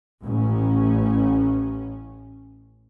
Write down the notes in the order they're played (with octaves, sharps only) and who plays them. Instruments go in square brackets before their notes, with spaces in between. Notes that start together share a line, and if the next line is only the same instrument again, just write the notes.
[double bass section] A1 C#4